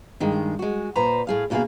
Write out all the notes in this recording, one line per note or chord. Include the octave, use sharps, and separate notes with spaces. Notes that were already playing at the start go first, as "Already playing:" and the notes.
G2 D#3 G#3
G#3 F#4
A#2 B4 C5 A#5
A2 G#4 F5
D2 B2 A#3 F#4 G#4 F5